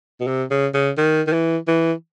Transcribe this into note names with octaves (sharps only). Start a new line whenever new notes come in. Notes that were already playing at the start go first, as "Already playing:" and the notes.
B2
C3
C#3
C#3
D#3
D#3
E3
E3